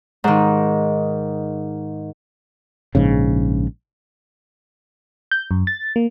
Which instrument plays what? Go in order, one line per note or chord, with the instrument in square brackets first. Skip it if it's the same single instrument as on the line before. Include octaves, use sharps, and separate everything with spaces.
[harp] G#2 D#3
[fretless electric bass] A#1 G#2 C#3
[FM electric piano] G6
F#2
A6
A#3